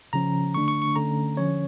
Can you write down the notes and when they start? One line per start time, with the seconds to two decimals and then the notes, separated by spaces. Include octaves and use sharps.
0.13 C#3 F3 C#4 A#5
0.54 D3 A3 D4 C#6
0.68 C#6
0.82 C#6
0.96 D3 A3 C#4 A#5
1.37 D3 F3 C#4 C#5